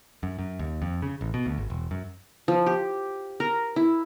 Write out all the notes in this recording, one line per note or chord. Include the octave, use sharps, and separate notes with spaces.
F#2
F#2
D#2
F2
C#3
A1
B2
D2
G#1
E1
F#2
F3
G4
A#4
E4